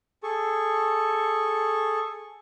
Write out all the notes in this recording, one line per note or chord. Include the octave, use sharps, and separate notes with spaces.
G#4 A4 C#6